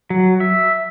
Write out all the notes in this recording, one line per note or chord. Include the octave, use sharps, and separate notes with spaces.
F#3
E5